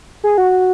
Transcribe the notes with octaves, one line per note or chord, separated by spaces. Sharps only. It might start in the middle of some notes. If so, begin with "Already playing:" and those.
G#4
F#4